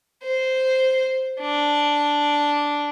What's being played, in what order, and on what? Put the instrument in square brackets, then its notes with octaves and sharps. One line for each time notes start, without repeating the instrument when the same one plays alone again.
[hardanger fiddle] C5
D4